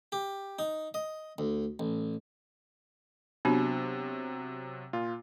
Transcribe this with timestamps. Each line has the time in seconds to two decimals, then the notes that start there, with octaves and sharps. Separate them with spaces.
0.12 G4
0.59 D#4
0.94 D#5
1.38 D2
1.79 A1
3.45 C3 F#3 B3 D4 F#4
4.93 A#2 F4